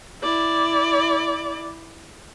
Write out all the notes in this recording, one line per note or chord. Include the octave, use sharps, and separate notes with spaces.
E4 D5